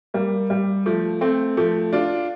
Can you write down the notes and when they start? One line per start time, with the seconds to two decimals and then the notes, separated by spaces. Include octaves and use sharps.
0.14 G3 A#3
0.50 G3
0.86 F3 A3
1.21 A3 C4
1.57 F3 A3
1.93 D4 F4